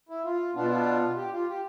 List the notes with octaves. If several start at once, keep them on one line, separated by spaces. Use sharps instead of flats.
E4
F4
B2 B3 D4 F4
F4
G4
F4
G4